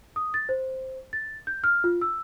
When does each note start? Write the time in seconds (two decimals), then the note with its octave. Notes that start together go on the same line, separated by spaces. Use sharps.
0.16 D#6
0.34 A6
0.49 C5
1.13 A6
1.47 G6
1.64 F6
1.84 F4
2.01 E6